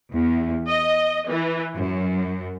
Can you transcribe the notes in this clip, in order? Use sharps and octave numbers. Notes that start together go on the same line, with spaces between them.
E2
D#5
E3
F#2